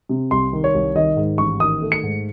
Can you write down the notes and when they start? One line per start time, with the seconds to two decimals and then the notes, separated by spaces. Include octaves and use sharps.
0.09 C3
0.31 C2 C6
0.53 D#3
0.64 C#5
0.74 C2
0.95 D#3 D#5
1.17 G#2
1.38 A1 C#6
1.60 D#3 D#6
1.82 A3
1.92 C#7
2.03 G#2